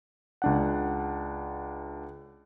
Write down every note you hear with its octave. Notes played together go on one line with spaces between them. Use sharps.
C#2 D4 F#5